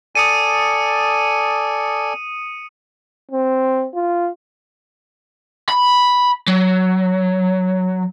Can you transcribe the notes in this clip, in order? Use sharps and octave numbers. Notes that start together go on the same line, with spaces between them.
A4 D5 G#5 D#6 C#7 D#7
C4
F4
B5
F#3